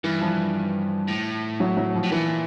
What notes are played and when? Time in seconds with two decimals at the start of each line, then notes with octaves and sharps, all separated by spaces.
0.04 G2 E3
0.21 F3
1.08 A2
1.60 F#3
1.77 F#3
1.95 F3
2.03 A2
2.12 A#2 E3